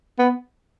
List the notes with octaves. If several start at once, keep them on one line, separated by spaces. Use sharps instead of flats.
B3